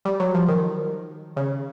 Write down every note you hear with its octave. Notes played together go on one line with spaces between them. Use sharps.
G3
F#3
F3
D#3
C#3